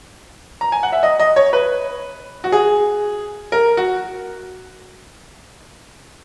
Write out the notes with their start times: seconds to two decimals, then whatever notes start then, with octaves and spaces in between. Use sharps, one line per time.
0.61 A#5
0.72 G#5
0.83 F#5
0.92 E5
1.03 D#5
1.19 D#5
1.36 C#5
1.53 B4
2.44 F#4
2.52 G#4
3.52 A#4
3.77 F#4